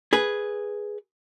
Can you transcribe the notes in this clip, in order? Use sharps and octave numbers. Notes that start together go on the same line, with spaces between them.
G#4 B4